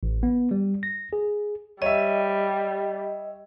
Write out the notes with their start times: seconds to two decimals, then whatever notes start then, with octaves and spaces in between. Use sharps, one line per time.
0.03 A1
0.23 B3
0.51 G3
0.83 A#6
1.13 G#4
1.82 G3 C#5 D#5 E5